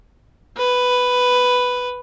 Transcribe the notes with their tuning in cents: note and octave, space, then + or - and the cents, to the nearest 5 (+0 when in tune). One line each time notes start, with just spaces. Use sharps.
B4 +5